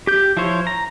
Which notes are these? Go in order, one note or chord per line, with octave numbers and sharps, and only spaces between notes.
G4 G6
F3 E4 F4 C5 C#5
A#5